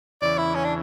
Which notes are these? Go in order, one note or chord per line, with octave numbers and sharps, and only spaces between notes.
E2 C#3 E3 D5
E4
C#4
D4